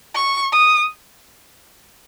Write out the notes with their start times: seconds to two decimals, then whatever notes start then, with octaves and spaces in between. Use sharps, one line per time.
0.15 C#6
0.52 D#6